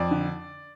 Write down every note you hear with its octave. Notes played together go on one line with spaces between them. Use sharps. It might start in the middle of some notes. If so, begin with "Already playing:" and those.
Already playing: F2 D5
D3